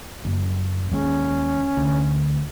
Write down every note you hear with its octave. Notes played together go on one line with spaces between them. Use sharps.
F#1
D#2 G#3 C#4
D2